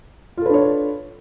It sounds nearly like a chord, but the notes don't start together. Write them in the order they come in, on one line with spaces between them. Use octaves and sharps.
F4 A4 B4 D4 C#5